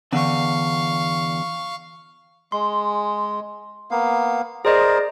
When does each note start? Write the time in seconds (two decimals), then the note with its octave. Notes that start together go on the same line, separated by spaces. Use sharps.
0.13 E2 D3 F5 C#6
2.52 G#3 C6
3.91 A#3 B3 F5
4.65 G#4 A#4 C5 D5 D#5